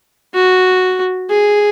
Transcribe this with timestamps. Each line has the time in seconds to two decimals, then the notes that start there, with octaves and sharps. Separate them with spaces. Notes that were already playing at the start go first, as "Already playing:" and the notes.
0.35 F#4
1.30 G#4